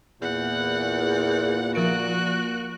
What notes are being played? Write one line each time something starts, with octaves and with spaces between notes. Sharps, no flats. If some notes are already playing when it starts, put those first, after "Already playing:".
E2 A#2 F#5
F3 F#4 A#4 F#6 D7